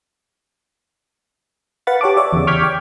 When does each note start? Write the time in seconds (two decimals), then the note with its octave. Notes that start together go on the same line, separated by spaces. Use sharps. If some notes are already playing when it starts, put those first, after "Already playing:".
1.87 B4 F5 F#5 B5 A6
2.01 G4 C#5 A5 D6
2.17 C#5 D5 E5
2.33 E2 C#3
2.47 C#6 D6 F6 G6 G#6 B6
2.63 G5